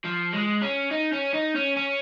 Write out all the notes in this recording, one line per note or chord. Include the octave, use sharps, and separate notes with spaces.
F3
G#3
C#4
D#4
C#4
D#4
C#4
C#4